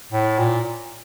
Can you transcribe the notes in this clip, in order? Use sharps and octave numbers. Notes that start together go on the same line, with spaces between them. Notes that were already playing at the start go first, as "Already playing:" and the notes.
A2
A#2